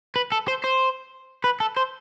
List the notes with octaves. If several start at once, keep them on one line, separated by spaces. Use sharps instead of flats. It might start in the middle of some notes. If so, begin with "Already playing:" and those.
B4
A4
C5
C5
B4
A4
C5